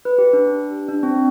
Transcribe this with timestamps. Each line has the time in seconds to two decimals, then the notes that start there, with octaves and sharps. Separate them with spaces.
0.05 B4
0.18 G4
0.33 D4
0.89 D4
1.03 C4